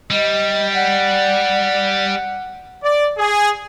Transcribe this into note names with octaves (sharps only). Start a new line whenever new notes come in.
G3 D#5
D5 F#5
D5
G#4